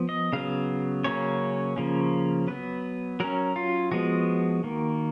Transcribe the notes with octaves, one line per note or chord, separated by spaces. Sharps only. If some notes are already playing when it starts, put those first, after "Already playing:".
Already playing: F3 B3
D#5
C#3 F#3 B3 F5
C#3 F#3 A#3 C#4 C#5
C#3 F3 A#3 C#4
F#3 B3 B4
F#3 C#4 A#4
F4
F3 G#3 B3 F#4
D#3 A#3